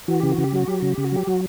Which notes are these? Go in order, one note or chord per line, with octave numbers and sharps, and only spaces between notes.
E3 F#4
C#3 G4
F#4
C#3
G4
F#3 F#4
F#3 G4
C#3 F#4
G4
C#3
F#4
F#3 G4
F#3 F#4